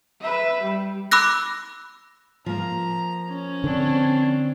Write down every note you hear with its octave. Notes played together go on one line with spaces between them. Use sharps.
B4 E5
G3
B5 D6 E6 F#6 A#6
F3 A#3 A#5
C#4
D3 C4 D4